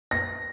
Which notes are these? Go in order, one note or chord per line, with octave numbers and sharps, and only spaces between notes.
A#6